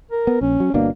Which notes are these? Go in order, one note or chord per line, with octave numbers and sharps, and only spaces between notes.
A#4
B3
A#1 C#4
F#3
G1 B2 A#3 D4